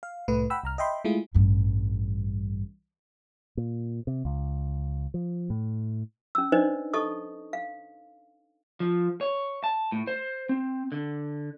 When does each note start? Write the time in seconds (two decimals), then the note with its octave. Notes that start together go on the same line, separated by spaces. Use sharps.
0.03 F5
0.28 C2 A2 A3 B4
0.50 F#5 G5 B5 E6
0.64 C2 A#5 F6
0.78 D#5 E5 G5 B5 C6
1.05 G#3 A3 E4 F4 G#4
1.34 A1 G2
3.57 A#2
4.07 C3
4.25 C#2
5.14 F3
5.50 A2
6.35 C#4 E6
6.52 D4 D#4 B4 C5 D5 D#5
6.93 A4 D#5 A5 C#6 D#6
7.53 F5
8.80 F3
9.21 C#5
9.64 A5
9.92 A2
10.07 C5
10.49 C4
10.92 D3